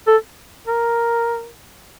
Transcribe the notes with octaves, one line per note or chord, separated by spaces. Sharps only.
A4
A#4